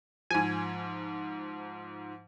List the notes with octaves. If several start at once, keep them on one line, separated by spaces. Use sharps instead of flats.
G#2 F3 G#5